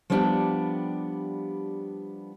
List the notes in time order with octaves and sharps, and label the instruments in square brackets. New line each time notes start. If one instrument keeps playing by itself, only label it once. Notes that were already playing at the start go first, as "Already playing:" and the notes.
[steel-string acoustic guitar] F3 G3 B3 D4 G4